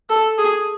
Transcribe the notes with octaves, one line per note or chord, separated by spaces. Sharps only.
A4
G#4